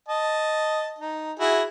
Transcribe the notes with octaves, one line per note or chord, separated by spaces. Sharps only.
D#5 A5
D#4
E4 F#4 G#4